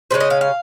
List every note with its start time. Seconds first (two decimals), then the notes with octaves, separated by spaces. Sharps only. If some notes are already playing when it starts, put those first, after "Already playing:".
0.11 C#3 G#3 C#4 C5
0.20 D#5
0.30 F5
0.41 F5